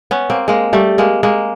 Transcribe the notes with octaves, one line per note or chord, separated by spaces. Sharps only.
B3 C#4
A#3 C4
G#3 A#3
G3 A3
G#3 A#3
G#3 A#3